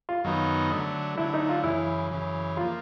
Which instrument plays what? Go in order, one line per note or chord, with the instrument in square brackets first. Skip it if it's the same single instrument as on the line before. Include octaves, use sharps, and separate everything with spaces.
[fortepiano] F4
[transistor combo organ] F#2 D#3 F#3 B3 D#4
D3 F#3 A3
[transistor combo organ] D3 F#3 A3 [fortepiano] E4
[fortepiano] D#4
F4
[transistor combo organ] F#2 C#3 E3 [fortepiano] E4
[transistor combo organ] F#2 C#3 E3
[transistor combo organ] F3 A#3 [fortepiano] F4